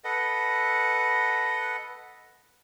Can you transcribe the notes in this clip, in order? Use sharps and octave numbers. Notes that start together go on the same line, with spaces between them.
A4 B4 D#5 F#5